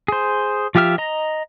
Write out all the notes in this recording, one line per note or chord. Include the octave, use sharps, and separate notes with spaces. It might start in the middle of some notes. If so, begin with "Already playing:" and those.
G#4 C5
F3 F4 G4 E5 F6
D#5 A#5